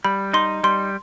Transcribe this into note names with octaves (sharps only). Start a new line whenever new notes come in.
G3 B5
D#4 C6
G3 C6